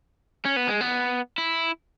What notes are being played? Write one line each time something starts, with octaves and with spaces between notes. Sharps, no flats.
C#4
B3
G#3
B3
E4